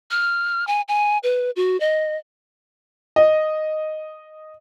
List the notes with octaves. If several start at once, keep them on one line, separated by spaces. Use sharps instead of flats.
F6
G#5
G#5
B4
F#4
D#5
D#5